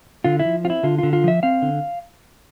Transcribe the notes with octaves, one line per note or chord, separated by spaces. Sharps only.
D3 F4
E4
F3
C4 F4
E4
D3 F4
D3 F4
F4
F3 E5
C4 F5
D3